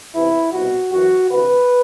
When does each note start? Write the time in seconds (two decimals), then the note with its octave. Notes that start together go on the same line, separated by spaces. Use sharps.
0.13 E2 C3 E3 E4
0.53 C2 B2 F#4
0.92 F#2 E3 F#4
1.31 D2 C3 E3 B4